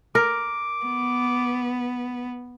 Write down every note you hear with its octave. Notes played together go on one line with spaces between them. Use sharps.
A#4 D6
B3